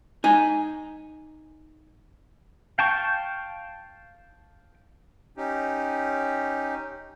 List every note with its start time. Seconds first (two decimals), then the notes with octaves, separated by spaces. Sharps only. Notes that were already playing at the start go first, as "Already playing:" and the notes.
0.24 D#4 G#5
2.78 F5 G5 A5 C#6
5.37 C#4 D#4 G4